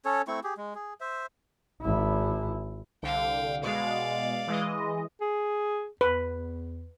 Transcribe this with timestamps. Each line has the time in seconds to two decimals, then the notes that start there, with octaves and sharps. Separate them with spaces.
0.05 C#4 A4 C#5
0.28 A3 C4 E4 C#6
0.44 G4 G#4
0.57 G#3
0.75 G#4
1.01 C5 E5
1.82 G#1 E4
3.03 C2 D3 F5 G5
3.63 B2 G#3 D5 F5
4.47 E3 G#3 D#5
5.21 G#4
6.01 E2 B4